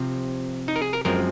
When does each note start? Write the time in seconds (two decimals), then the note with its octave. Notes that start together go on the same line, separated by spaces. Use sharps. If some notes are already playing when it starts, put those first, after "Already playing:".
Already playing: C3 F3 C4
0.68 D#4
0.76 A#4
0.81 G#4
0.93 A#4
1.05 F#2 F3 G#3 C4 A#4